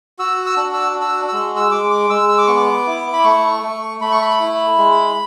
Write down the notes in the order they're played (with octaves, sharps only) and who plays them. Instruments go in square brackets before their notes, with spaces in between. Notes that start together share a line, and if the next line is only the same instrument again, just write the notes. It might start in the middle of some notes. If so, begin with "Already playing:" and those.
[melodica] F#4 E6
E6
D4
E6
F#4
E6
G#3 E6
E6
G#3 D6
D6
G#3 E6
E6
D6
B3 C#6
D6
E4
B5
A3 C#6
A3
A3 B5
C#6
B5
E4
G#3